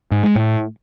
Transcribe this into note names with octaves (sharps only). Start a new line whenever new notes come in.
G#2
G#3
A2